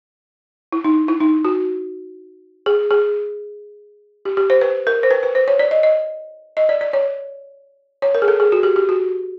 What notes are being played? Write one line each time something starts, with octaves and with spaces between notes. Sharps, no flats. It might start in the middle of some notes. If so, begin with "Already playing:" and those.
E4
D#4
E4
D#4
F#4
G#4
G#4
G4
G4
C5
B4
A#4
C5
B4
B4
C5
C#5
D5
D#5
D#5
D#5
D5
D5
C#5
C#5
A#4
G#4
A4
G#4
F#4
G4
G4
F#4